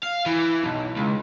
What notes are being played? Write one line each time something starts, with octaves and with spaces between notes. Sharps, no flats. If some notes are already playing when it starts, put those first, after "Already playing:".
F5
E3
B1
C#2